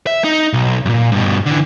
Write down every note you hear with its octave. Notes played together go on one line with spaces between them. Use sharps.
E5
D#4
B1
F#2 A#2
G2 B2
D3 E3